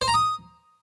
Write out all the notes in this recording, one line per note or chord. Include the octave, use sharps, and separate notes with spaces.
C5
A#5
D#6